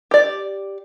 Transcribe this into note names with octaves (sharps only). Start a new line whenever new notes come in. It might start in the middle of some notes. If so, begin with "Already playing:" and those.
G4 D5